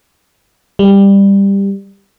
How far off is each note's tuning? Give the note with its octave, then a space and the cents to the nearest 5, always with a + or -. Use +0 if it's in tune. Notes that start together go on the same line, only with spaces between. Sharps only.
G3 +15